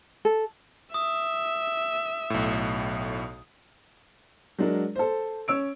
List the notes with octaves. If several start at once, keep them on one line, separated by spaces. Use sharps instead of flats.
A4
E5 D#6
B1 A2
F#3 G#3 D4 A#4
A4 C5
C#4 C#5 E6 D7